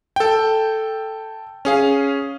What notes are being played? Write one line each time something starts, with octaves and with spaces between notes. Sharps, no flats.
A4 G5
C#4 G#4 F5